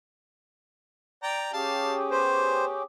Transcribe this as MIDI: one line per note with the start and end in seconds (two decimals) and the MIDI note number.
1.23 1.53 74
1.23 1.53 79
1.23 1.53 82
1.53 2.83 61
1.53 2.83 67
1.53 2.83 68
1.53 1.96 77
1.53 1.96 81
2.11 2.74 59
2.11 2.65 72